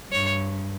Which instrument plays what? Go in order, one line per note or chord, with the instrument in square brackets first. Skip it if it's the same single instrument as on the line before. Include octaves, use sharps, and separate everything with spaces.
[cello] G2 [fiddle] C#5